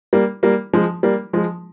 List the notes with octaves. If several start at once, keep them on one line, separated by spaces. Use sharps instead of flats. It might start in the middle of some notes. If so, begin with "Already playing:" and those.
G3 A#3
G3 A#3
F3 G#3
G3 A#3
F3 G#3